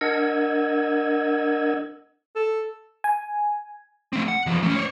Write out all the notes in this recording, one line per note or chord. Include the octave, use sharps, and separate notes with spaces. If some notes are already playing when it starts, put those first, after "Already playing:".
D4 A#4 D#5 F#5 E6 G#6
A4
G#5
A3 C4
F#5
E2 F3
A3 C#4
C5 C#5